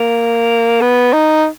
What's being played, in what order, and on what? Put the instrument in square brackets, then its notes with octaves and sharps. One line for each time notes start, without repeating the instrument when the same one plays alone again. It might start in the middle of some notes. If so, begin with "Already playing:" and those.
Already playing: [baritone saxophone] A#3
B3
D#4